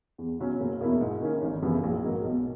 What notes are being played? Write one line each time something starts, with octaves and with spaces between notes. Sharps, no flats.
E2
B2 F#3 C#4
F#1
E2 B2 A#3 E4
G#2
D#3 A#3 C#4
G#1
F#2 C#3 E3 B3
A#1
G#2 F#3 A#3
B1